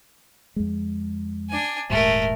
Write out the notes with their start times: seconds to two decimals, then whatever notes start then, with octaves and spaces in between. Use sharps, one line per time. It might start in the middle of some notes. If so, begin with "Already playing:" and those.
0.56 F2 G#3
1.49 D4 G#5
1.90 D#1 G#2 G3 A3 A#4